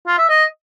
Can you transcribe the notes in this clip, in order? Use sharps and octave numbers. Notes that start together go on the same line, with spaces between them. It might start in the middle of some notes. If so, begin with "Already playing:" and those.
F4
E5
D#5